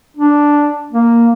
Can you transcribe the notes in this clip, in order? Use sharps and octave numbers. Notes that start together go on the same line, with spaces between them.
D4
A#3